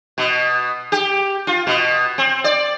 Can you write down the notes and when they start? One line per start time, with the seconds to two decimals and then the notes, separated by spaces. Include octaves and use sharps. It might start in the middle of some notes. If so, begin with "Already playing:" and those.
0.18 B2
0.92 G4
1.47 F4
1.67 B2
2.18 C4
2.44 D5